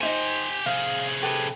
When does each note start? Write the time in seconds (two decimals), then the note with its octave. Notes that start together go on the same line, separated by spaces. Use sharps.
0.01 D#4 E4 G4 C5 G#5
0.66 C3 G#4 F5
1.23 G4 A4 B4